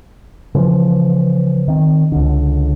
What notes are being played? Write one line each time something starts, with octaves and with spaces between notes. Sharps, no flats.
C#3 E3 F3
D#3 C4
C#2 D3